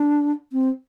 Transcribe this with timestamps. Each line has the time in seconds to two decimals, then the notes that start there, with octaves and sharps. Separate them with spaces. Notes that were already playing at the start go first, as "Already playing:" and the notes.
Already playing: D4
0.53 C4